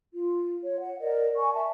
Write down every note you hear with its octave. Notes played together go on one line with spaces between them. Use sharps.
F4
C#5
F#5
A#4 D5 D#5
G#5 C#6
E5 A5